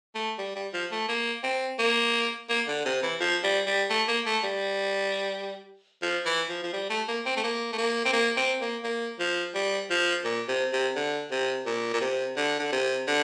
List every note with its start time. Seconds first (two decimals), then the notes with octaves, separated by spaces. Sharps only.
0.15 A3
0.38 G3
0.55 G3
0.73 F3
0.92 A3
1.08 A#3
1.43 C4
1.79 A#3
2.49 A#3
2.68 D3
2.85 C3
3.03 E3
3.20 F3
3.44 G3
3.67 G3
3.90 A3
4.08 A#3
4.26 A3
4.43 G3
6.02 F3
6.25 E3
6.49 F3
6.63 F3
6.73 G3
6.90 A3
7.08 A#3
7.26 C4
7.37 A3
7.43 A#3
7.72 A3
7.78 A#3
8.05 C4
8.13 A#3
8.37 C4
8.61 A#3
8.83 A#3
9.19 F3
9.55 G3
9.90 F3
10.25 A#2
10.48 C3
10.73 C3
10.96 D3
11.31 C3
11.66 A#2
11.93 A#2
12.01 C3
12.37 D3
12.59 D3
12.72 C3
13.07 D3